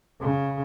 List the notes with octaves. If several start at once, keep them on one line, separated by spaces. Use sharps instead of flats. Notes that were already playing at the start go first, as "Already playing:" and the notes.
C#3